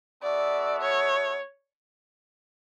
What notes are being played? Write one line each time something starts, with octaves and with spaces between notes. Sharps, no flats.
B3 F#4 A4 D5 E5
C#5